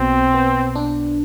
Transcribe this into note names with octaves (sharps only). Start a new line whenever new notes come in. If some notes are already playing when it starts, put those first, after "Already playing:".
Already playing: B1 B2 C4
B3
D4